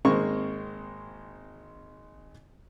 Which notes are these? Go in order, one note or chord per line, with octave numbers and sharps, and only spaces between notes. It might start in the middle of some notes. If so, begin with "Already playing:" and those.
G#1 G#3 A#3 C4 C#6